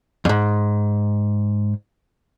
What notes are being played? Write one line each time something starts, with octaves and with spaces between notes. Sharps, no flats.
F2 G#2